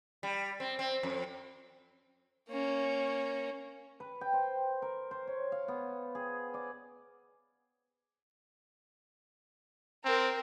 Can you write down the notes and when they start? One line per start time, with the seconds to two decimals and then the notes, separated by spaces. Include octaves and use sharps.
0.23 G3
0.60 C4
0.79 C4
1.03 F2
2.49 A#3 C#4
4.00 B4
4.21 G5
4.33 C5
4.82 A#4
5.11 C5
5.27 C#5
5.52 F5
5.68 B3
6.15 G#4
6.54 D5
10.05 C4 A#4